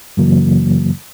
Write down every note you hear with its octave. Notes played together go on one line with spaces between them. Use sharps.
F#2 C#3 E3 F#3 A#3